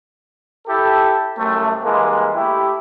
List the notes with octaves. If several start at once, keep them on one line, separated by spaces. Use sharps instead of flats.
E4 G4 A4
C2 F#2 A3
G2 E3 G#3 A#3
A3 E4 G4